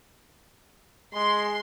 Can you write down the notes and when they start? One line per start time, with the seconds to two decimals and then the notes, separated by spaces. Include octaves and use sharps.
1.14 G#3 C6